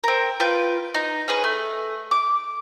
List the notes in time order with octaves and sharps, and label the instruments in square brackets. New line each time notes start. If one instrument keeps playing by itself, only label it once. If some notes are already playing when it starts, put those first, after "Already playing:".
[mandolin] C4 A#4
F4 B4 G5 G6
D#4
C#4 G#4 B4
A3
D6